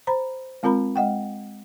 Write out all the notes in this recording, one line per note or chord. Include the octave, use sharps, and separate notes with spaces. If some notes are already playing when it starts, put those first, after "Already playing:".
C5 A#5 B5
G#3 C4 F4 A#4 A#5 B5
G#3 D#5 F#5 G5